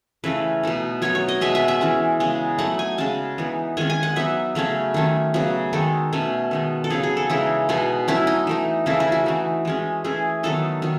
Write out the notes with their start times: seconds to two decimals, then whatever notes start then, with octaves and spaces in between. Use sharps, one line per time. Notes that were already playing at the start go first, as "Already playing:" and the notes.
0.24 C#3 E3 A3 C#4 B4
0.63 B2 A3 D#4
1.02 F#3 B3 D#4 C#5
1.15 C#5
1.28 D#5
1.41 B2 G#3 B3 E5
1.55 E5
1.68 E5
1.81 E3 G#3 C#4
2.20 C#3 G#3 B3
2.58 F#3 A3 D#4 F#5
2.79 G#5
2.98 C#3 G#3 C#4 A5
3.38 E3 B3 D#4
3.77 D#3 G#3 C#4 G#5
3.90 G#5
4.03 F#5
4.16 F#3 B3 D#4 E5
4.55 C#3 F#3 A3 C#4
4.94 D#3 A3 C#4
5.34 C#3 F#3 B3
5.73 D#3 G#3 D#4 A4
6.12 B2 A3 C#4
6.51 D#3 G#3 D#4
6.84 A4
6.90 C#3 F#3 B3 D#4 G#4
7.03 G#4
7.17 A4
7.30 C#3 E3 G#3 D#4 E4
7.69 B2 G#3 B3 D#4
8.08 F#3 A3 C#4 E4
8.27 D#4
8.47 E3 A3 D#4
8.86 C#3 E3 A3 C#4 E4
9.00 E4
9.12 F#4
9.26 E3 A3 D#4
9.65 E3 G#3 C#4
10.04 E3 A3 C#4 G#4
10.43 D#3 F#3 B3 D#4 A4
10.82 D#3 F#3